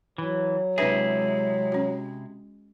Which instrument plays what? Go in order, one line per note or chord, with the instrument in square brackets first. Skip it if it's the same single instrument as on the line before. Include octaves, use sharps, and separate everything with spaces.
[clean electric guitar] E3 [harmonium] F#3
[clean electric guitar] C3 E4 G#4 [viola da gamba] G#3 [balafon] D4 B4 E5
[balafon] C#4 F#4